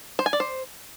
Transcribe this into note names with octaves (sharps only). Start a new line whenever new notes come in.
C5
G#5
D5
C5